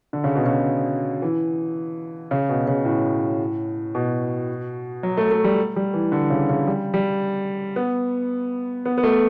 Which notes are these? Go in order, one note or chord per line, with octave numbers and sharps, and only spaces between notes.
D3
C#3
B2
C#3
E3
C#3
B2
C#3
A2
B2
F#3
A3
A3
G3
G3
E3
D3
C#3
C#3
G3
G3
B3
B3
B3
A3